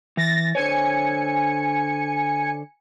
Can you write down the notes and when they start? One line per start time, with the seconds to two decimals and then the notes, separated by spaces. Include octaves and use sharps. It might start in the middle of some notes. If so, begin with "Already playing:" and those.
0.17 E3 A6 A#6
0.55 D3 C5 C#5 G#5 C#7